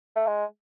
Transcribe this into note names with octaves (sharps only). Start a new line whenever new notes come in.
A3
G#3